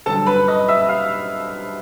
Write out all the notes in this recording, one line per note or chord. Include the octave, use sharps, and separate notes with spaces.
G2 D3 F#3 A4 A5
B4 B5
D#5 D#6
E5 E6
F5 F6